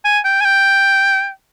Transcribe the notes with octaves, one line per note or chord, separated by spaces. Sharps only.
G#5
G5
G#5
G5